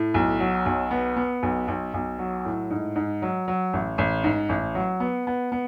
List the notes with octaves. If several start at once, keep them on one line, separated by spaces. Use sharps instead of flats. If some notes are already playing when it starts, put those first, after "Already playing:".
Already playing: A2
B1
F#3
B1
B3
B3
B1
B1
B1
F#3
A2
G#2
G#2
F#3
F#3
A1
A1
G#2
A1
F#3
B3
B3
B3